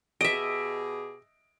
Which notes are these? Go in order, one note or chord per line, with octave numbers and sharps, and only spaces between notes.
B2 G4 G#4 D#5 E5 D7